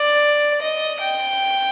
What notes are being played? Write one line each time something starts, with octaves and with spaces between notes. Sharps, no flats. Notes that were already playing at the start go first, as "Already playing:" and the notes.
Already playing: D5
D#5
G5